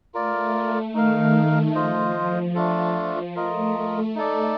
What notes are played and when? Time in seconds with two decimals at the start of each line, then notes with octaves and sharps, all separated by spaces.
0.14 A3 F4 A#4 D5
0.94 D#3 D#4 A#4 F5
1.75 F3 F4 C5 D#5
2.55 A3 D4 F4 A4
3.35 A3 F4 A#4 D#5
4.15 D#4 A4 D5